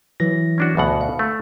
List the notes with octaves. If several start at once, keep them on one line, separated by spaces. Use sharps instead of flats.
E3 F#3 A#6
C#4 D4 F#4
D2 B2 F#5
F5
A3